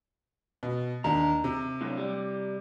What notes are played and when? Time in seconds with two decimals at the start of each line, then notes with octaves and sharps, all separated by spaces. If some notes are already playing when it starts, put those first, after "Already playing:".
0.63 B2
1.04 D#2 D4 A#5
1.44 C3
1.81 A2 D3 F#3
1.97 G3